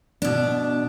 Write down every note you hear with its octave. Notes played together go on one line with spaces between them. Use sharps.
B2 D4